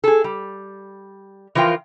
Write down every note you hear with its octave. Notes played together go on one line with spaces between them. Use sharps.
G#4 A4
G3
E3 F3 F4 A#4 G5